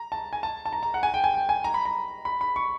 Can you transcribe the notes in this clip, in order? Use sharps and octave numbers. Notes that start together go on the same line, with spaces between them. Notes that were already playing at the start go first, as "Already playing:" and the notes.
Already playing: A#5
A5
G#5
A5
A5
A#5
A#5
F#5
G#5
G5
G#5
G5
G#5
A#5
B5
A#5
B5
B5
C#6